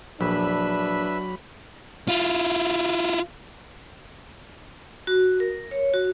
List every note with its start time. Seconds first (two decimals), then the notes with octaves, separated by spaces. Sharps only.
0.21 A#1 F#3 D4 B4 E5 B5 E6
2.08 E4 F4
5.07 F#4
5.40 A#4
5.71 C#5
5.94 F#4